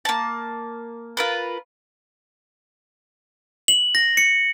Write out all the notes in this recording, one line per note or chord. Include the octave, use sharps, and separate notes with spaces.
A#3 A5
F4 A#4 B4
F#7
A#6
C#7